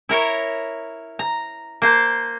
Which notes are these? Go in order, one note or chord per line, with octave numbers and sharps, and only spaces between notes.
E4 A#4 C#5
A#5
A#3 C5 A5